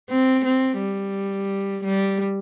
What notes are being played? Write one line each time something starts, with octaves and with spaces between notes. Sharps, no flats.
C4
C4
G3
G3